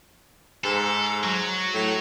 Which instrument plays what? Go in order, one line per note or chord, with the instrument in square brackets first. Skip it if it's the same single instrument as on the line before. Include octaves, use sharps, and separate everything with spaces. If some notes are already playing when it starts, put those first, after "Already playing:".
[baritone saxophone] G#2 [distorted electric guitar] A4
[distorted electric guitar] F#3
[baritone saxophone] A2